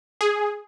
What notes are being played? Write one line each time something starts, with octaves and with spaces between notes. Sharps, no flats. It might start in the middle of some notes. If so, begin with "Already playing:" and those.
G#4